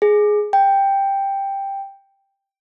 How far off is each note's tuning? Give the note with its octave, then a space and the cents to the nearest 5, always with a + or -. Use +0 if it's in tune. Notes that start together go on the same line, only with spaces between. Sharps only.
G#4 +10
G5 +5